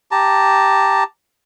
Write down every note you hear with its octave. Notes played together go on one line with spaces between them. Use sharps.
G4 A5 A#5